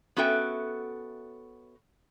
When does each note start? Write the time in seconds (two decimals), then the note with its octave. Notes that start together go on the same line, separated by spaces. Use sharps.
0.16 B3 C#4 F#4 A4 E5 G5